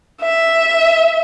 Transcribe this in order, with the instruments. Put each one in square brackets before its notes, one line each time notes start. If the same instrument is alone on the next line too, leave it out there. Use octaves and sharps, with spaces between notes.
[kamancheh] E5